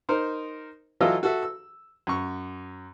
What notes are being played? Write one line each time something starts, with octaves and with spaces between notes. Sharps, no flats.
D#4 A#4 C5
E3 F#3 F4 A4 D#5 E5
F#4 A4 E5
E6
F#2 C#6